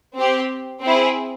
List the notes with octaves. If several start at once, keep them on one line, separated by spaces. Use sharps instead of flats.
C4 G4
C4 E4 G#4